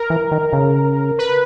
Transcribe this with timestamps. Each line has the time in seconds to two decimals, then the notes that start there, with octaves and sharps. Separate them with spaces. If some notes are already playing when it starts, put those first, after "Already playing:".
Already playing: A#4
0.10 E3
0.32 D#3
0.53 C#3
1.18 B4